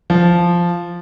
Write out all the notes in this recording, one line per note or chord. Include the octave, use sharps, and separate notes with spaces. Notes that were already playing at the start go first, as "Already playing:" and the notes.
F3